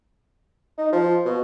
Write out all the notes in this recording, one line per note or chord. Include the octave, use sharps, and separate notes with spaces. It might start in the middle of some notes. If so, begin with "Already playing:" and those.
D#4
F3
B2